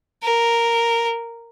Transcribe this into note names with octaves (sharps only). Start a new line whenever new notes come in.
A#4